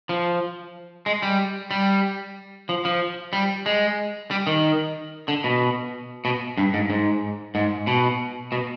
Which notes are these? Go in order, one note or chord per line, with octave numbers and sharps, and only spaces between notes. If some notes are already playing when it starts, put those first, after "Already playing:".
F3
G#3
G3
G3
F3
F3
G3
G#3
G3
D#3
D3
B2
B2
G2
G#2
G#2
G#2
B2
B2